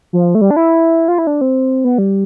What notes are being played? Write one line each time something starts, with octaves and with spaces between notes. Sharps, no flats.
F3
A3
G3
D4
E4
F4
E4
D4
C4
B3
G3